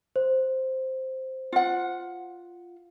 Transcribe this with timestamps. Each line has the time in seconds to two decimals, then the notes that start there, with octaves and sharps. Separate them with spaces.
0.16 C5
1.52 F4 F#5